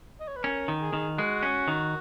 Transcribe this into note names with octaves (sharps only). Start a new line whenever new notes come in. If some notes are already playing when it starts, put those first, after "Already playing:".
D#5
C#5
B4
C#4 A#4
D#3
G#4
D#3
G#3 F#4
C#4
D#3